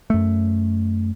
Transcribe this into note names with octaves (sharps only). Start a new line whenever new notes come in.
F#2 A3